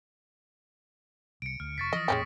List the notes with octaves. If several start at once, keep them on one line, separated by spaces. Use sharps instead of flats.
C2 C#7 D7
D2 F6
F1 C#6 A6 B6
E3 F3 D#5 D#6 A#6
A1 F2 A#2 G#3 C#4 G4